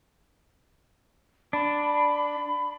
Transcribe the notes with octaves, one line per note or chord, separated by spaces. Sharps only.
D4 B5